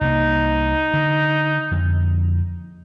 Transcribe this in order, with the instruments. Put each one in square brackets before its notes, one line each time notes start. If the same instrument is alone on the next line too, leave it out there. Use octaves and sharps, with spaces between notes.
[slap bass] C2 A#3 [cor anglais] D#4
[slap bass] D3
F2 D3